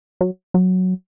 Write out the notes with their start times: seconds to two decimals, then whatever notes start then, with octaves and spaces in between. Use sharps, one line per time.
0.21 F#3
0.54 F#3